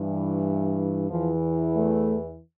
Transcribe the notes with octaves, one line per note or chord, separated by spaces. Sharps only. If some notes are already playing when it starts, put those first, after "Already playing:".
Already playing: G2 E3
E2 E3 F3
A3